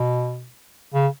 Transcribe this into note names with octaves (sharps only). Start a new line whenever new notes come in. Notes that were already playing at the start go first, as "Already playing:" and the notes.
Already playing: B2
C#3